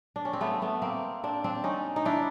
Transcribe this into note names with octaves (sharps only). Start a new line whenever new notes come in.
D4
C#4
C4
A3 B3
A3 B3
A#3 C4
C4 D4
C4 D4
C#4 D#4
D#4
D4 E4